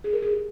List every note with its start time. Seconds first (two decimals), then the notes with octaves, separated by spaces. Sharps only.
0.04 G#4
0.13 A#4
0.22 G#4
0.31 G4